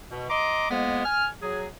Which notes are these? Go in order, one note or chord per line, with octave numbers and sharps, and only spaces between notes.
B2
D#5 A#5 C6 D6
F2 G#3 A#3 B3
G#5 F6
F#3 G#4